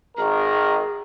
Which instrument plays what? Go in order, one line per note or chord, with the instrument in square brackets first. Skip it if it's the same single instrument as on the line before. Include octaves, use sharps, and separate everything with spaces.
[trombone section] G#1 D#3 A#4 [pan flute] G#4